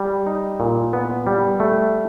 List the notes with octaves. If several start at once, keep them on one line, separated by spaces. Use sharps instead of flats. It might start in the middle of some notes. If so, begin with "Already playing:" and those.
Already playing: G3
D#4
A#2
B3
G3
A3